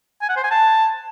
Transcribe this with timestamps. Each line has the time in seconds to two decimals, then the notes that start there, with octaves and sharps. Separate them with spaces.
0.22 G#5
0.29 F#5
0.36 C5
0.44 G#5
0.51 A5